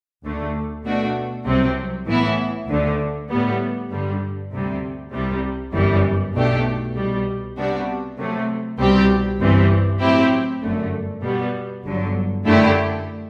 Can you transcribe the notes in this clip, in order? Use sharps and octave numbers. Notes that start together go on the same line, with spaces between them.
D2 D3 A3
B2 A3 D4 F#4
C2 C3 F#3 C4
A2 E3 B3 E4
D2 D3 A3
A2 G3 B3
G2 D3 G3
D2 C3 G3
C2 C3 G3
G1 F#2 E3 G3
B1 B2 A3 D4 G4
C2 B2 G3
C3 G3 B3 D4 F#4
C3 F#3 A3
C2 B2 G3 C4 G4
G1 G2 E3 G3 C4
A2 F#3 C4 E4 G4
G1 F#2 D3 A3
B2 G3 B3
G1 G2 D3 F#3
F#2 D3 A3 E4 G4